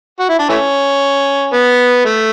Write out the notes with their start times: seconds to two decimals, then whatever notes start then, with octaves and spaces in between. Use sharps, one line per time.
0.19 F#4
0.29 E4
0.39 D4
0.49 E3 A3 C#4
1.53 B3
2.06 A3